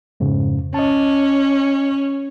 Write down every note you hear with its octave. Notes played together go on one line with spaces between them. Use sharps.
F2 G#2 C#3
C#4 D#5 A5